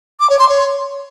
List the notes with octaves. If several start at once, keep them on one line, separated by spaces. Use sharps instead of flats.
D6
C#5
C6
C#5